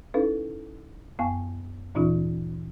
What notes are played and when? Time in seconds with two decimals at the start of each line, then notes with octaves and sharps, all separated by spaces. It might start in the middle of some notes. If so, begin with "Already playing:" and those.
0.14 C#4 D#4 E4 A4 B4 F5
1.19 F#2 B3 F5 G5 G#5 C#6
1.95 D2 A#2 E3 C#4 D#4 F4